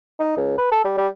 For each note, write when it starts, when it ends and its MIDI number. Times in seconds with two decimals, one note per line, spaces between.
0.19 0.33 63
0.37 0.55 37
0.58 0.71 71
0.71 0.84 69
0.84 0.97 55
0.97 1.07 55